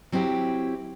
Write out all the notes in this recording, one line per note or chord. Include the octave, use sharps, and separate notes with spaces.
F#3 C4 E4 G4